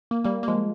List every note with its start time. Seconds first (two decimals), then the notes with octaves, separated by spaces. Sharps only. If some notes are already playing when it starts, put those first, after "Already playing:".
0.11 A#3
0.24 G3 A#3
0.43 A#3
0.48 F3 G#3